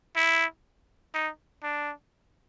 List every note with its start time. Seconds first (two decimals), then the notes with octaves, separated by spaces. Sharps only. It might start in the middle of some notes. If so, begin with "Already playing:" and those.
0.16 E4
1.14 D#4
1.63 D4